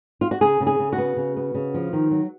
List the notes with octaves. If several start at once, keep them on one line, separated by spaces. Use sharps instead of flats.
F4
F#4
C#3 G#4
C#3
G#4
C#3
F#4
B3
C#3
B3
C#3
F3
D#3
F#3